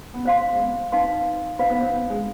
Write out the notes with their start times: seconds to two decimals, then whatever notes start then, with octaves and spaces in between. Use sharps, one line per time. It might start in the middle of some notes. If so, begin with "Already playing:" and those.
0.14 B3
0.25 C4 C5 F5 C6
0.52 G#3
0.59 B3
0.92 C4 D#4 B4 F5 C6
1.59 C4 B4 F5 B5
1.70 B3
1.80 C4
1.94 B3
2.10 G#3